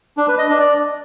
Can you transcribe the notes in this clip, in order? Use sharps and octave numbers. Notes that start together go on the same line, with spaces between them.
D4
B4
D#5
D4
D5